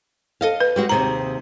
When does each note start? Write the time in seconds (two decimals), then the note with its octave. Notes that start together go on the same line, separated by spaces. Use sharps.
0.41 A4 D#5 F5
0.60 B4
0.76 G3 G#3 F#4
0.89 D#2 C3 G#4 A#5